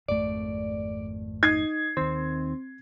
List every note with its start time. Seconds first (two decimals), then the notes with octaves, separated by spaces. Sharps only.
0.08 G#1 F2 A3 D5
1.43 D#4 G#6 C7
1.97 D#2 D#3 C4